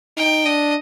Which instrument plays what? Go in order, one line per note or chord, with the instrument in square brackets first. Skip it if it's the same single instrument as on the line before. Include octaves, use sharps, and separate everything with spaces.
[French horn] D#4 [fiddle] G5
[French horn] D4 [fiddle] D#5